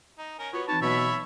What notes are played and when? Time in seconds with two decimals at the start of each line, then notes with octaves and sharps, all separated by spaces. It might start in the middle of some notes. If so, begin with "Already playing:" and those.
0.19 D#4
0.39 C#4 A#4
0.53 B3 F4 F#4 B4 C#5
0.68 E3 C4 D#4 B4 C#5 A5
0.82 B2 F#3 C#5 E5 B5